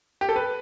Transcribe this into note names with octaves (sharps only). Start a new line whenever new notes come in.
G4
A4
B4